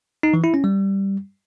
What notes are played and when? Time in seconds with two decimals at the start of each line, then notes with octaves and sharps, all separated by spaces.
0.23 D#4
0.34 E3
0.44 E4
0.54 C#4
0.64 G3